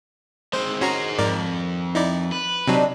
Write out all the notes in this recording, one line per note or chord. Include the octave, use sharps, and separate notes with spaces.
G#3 C4 C5
D#3 C#4 F#4 G#4 C5 A#5
F2 G#2 A#4 D5
D#4 E4 D5
B4
C3 F#3 C4 D4 D#4